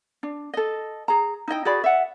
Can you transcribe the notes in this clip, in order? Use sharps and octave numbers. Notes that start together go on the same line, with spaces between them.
D4
A4 D#5
G#4 A#5
D#4 E4 D#5 G5
F#4 G#4 D5 B5
E5 F#5